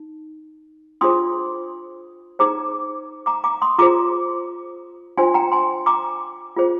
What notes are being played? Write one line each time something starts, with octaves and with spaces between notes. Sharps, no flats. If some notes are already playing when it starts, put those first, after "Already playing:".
Already playing: D#4
D4 F4 G#4 C5 C6 D#6
D#4 G#4 C5 A#5 D6
A#5 D6
A#5 D6
C6 D#6
F4 G#4 C5 A#5 D6
D4 F4 C5 G#5 C6
G5 A#5
G#5 C6
A#5 D6
F4 G#4 C5